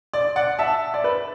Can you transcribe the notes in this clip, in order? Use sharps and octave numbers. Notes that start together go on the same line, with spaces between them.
D5
D5 F#5
E5 A5
D5
B4